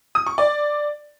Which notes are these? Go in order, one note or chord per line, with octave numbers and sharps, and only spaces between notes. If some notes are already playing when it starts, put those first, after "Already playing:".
D#6
C#6
D5